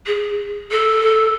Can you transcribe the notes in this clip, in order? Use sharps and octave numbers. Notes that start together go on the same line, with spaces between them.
G#4
A4